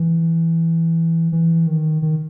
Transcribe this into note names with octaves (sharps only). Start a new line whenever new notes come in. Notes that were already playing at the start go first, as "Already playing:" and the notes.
Already playing: E3
E3
D#3
D#3